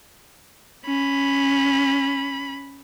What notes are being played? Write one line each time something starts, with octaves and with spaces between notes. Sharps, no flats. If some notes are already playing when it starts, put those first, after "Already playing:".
C#4 B5